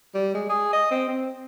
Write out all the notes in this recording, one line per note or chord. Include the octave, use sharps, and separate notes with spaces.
G3
G#3
G#4
D#5
C4
C4